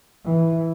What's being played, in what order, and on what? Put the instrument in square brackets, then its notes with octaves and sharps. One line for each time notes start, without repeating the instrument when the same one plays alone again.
[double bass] E3